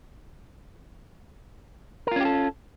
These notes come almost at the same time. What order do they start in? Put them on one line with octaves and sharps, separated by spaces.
A#4 F4 C#4 G4 A4